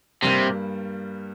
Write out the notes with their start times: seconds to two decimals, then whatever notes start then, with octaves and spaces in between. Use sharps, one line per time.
0.22 G2 C3 G3 A#3